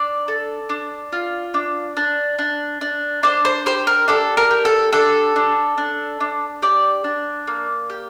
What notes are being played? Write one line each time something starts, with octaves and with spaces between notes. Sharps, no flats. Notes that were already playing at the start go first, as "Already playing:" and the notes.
Already playing: D4 D5
A4
D4
F4
D4
D4
D4
D4
D4 C5
C5
G4 C5
A#4
D4 A4
A#4
G4
A4
D4 A4
D4
D4
D4
G4 D5
D4
A#3
G4